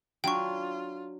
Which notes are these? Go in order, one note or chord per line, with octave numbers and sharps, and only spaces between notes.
F#3 D4 F4 G5 C#6